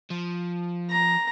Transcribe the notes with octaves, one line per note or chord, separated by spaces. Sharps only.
F3
A#5